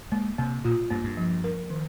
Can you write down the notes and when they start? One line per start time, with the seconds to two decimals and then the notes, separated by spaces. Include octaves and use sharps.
0.12 G#3 A#3
0.38 C3 A#3
0.64 A#2 F4
0.90 G2 A#3
1.04 G2
1.17 F3
1.44 A#4
1.70 D#3